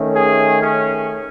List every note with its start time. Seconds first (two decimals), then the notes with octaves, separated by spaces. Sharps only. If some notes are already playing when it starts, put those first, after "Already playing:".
Already playing: D#3 A3 C#4
0.15 G#4
0.61 C#4